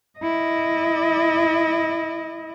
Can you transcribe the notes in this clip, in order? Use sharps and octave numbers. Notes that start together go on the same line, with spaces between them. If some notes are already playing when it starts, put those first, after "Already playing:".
E4 D#5